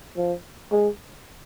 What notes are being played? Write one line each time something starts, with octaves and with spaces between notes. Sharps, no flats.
F3
G#3